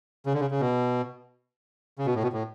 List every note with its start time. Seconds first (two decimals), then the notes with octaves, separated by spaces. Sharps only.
0.26 C#3
0.34 D3
0.40 C#3
0.51 C#3
0.60 B2
1.99 C#3
2.06 B2
2.15 A2
2.23 B2
2.33 A2